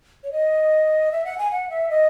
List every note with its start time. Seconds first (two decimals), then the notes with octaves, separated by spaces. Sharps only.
0.24 C#5
0.32 D#5
1.12 E5
1.25 F#5
1.38 G#5
1.51 F#5
1.70 E5
1.90 D#5